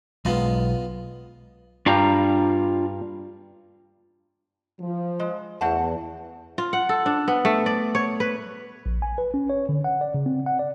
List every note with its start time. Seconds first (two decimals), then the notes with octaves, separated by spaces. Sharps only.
0.25 B1 G#3 B3 F4 D#5
1.86 G2 G3 D4 F4 A#5
4.80 F3
5.19 G#3
5.61 E2 A3 F#5 A5
6.58 F4
6.73 F#5
6.89 A4
7.06 D4
7.28 B3
7.45 A3
7.66 D5
7.95 C#5
8.20 B4
8.86 A#1
9.02 G#5
9.18 B4
9.34 C#4
9.50 C#5
9.69 D3
9.84 F#5
10.01 D5
10.14 C#3
10.26 C4
10.46 F#5
10.59 D5